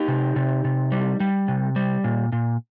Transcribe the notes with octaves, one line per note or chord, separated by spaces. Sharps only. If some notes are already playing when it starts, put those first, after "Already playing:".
Already playing: D#4 G4
C3
C3
C3
G3
G3
C3
G3
A#2
A#2